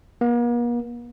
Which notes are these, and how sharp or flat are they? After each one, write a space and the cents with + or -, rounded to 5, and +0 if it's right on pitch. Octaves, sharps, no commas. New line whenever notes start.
A#3 +45